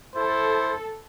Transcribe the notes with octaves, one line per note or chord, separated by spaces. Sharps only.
E4 A4 C5